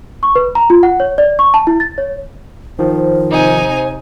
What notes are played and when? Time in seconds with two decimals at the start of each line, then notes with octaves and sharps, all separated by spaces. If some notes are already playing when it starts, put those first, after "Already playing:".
0.23 C#6
0.35 B4
0.55 A#5
0.70 F4
0.83 F#5
1.00 C#5
1.18 D5
1.39 C#6
1.54 A5
1.67 E4
1.80 A6
1.98 C#5
2.79 D#3 F3 C5
3.30 C3 D#4 G#5